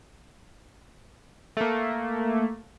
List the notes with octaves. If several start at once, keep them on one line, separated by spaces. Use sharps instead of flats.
A3 A#3